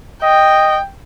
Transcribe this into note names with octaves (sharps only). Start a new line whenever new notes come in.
D#5 G5